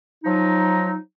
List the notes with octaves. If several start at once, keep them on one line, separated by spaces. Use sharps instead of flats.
F3 F#3 D#4